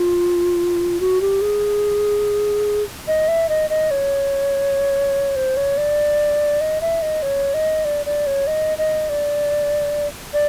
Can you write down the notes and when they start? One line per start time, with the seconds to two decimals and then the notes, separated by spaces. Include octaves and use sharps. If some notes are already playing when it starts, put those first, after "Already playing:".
Already playing: F4
1.00 F#4
1.21 G4
1.41 G#4
3.08 D#5
3.28 E5
3.49 D#5
3.70 D#5
3.91 C#5
5.36 C5
5.57 C#5
5.77 D5
6.61 D#5
6.81 E5
7.02 D#5
7.22 C#5
7.54 D#5
7.85 D5
8.06 D5
8.27 C#5
8.47 D#5
8.78 D#5
9.09 D5
10.34 D5